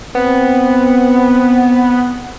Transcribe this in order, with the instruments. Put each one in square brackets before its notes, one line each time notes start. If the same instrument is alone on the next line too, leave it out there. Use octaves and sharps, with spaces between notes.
[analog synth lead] B3 [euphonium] C4